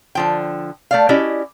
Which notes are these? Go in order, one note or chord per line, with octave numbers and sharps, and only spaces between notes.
D3 F3 G5
A3 D5 F5
C#4 E4 F#4 G4 D5 D#5